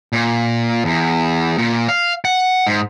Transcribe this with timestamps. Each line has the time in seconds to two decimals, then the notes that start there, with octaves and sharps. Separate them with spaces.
0.13 A#2
0.85 E2
1.58 A#2
1.88 F5
2.25 F#5
2.67 G#2